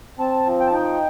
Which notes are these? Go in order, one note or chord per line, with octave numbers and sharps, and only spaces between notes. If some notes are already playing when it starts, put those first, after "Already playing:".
C4 A5
F3
G5
A5
D#4 G5